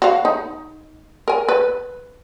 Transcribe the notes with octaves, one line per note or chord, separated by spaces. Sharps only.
F#4 F5
D#4
A#4 G#5
B4